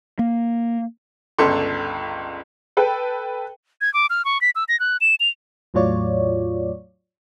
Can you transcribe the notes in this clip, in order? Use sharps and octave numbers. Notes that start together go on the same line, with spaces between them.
A#3
G1 C#2 A4 C6
A4 B4 G5
G#6
D6
F6
C#6
B6
E6
A#6
F#6
E7
F7
E2 A2 F#3 F4 C#5 D5